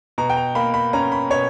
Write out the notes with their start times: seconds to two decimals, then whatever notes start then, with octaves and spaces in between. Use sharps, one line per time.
0.18 B2 A#5
0.30 G5
0.37 A#5
0.55 A#3 B5
0.74 B5
0.93 C#4 A#5
1.12 B5
1.30 B2 C#5